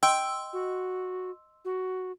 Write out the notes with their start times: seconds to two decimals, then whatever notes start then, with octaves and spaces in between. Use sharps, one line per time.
0.03 D#5 G5 C6 E6
0.53 F#4
1.65 F#4